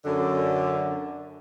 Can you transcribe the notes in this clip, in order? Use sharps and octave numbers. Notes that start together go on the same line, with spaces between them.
F#2 D3